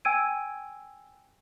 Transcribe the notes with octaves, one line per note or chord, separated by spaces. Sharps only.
G5 G#5 E6 G#6 D7 D#7